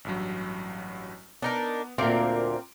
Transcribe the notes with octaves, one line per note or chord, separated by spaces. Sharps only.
A1 G2 F#3
B3 D4 D#4 A#4
D2 A#2 A#3 C4 A#4 C6 D6 D7